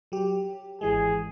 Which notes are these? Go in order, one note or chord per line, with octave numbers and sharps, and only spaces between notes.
F#3 G4
G#1 E3 G#3 G#4